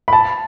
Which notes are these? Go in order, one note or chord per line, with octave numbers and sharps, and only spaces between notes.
B5
A5